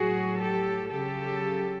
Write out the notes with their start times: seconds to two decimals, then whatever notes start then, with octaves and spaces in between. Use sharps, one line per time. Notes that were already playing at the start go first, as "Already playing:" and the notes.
Already playing: A2 F#3 F#4 G#4
0.41 G4 A4
0.92 C#3 F#3 G4 A4